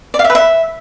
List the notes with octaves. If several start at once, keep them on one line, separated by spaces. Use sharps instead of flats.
D5
F5
E5
B4
E5